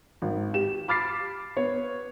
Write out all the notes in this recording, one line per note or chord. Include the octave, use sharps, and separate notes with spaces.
G#1
G4 E7
B5 D6 F6 A6 B6 C7
B3 C#5